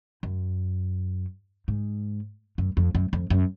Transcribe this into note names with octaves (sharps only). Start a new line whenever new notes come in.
F#2
G#2
F#2
F2
F#2
F2
F#2